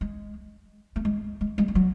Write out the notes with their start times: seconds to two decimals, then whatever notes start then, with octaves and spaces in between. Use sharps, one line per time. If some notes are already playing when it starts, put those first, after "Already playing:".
0.01 G#3
0.96 A3
1.05 G#3
1.41 G#3
1.58 G#3
1.68 G#3
1.75 F#3